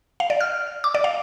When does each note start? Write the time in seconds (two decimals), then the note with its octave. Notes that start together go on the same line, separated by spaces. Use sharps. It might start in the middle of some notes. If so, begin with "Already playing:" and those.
0.20 F5
0.30 D5
0.41 F6
0.84 D6
0.95 D5
1.04 F5